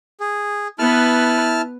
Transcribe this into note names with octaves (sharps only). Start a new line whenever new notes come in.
G#4
B3 E4 B4 A5 F6